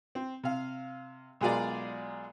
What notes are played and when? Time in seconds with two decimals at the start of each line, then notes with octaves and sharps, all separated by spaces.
0.15 C4
0.44 C3 F5
1.41 B1 G#3 F4 G#4 A#4 D5